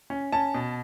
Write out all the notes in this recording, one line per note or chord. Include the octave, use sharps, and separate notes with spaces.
C#4
C#4 A5
B2